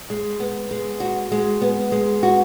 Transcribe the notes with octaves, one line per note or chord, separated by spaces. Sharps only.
G#3
B3
G#3
F#4
G#3
B3
G#3
F#4